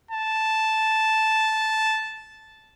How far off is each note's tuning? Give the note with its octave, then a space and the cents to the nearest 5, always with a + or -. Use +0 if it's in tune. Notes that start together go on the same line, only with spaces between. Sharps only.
A5 -5